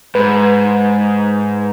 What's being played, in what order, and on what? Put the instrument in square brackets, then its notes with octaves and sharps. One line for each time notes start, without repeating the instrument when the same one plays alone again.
[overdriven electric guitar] G#2 [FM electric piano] B4